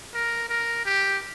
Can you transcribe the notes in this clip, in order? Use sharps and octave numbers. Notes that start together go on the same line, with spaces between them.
A#4
A#4
G4